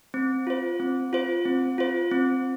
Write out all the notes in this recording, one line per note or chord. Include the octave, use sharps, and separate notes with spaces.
C4
F4 C5
C4
F4 C5
C4
F4 C5
C4